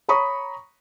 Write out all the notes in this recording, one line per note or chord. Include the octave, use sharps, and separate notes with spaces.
C#5 A#5 B5 C#6 D#6